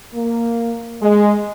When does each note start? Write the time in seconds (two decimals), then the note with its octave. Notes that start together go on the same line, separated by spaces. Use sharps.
0.14 A#3
1.02 G#3